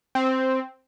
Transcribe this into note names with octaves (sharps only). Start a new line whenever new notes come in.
C4